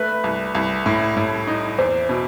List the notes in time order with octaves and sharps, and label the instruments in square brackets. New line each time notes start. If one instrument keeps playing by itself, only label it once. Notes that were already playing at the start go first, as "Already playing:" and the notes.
Already playing: [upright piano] A3 [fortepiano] B4
[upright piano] C2
C2
A2
A2
D#4
[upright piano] E2 [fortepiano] C5
[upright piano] B2